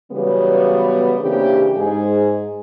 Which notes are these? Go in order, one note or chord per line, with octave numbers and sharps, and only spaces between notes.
C#3 E3 F#3 G3 B3
C#3 E3 A#3 C4 D4 G4
G#2 G#4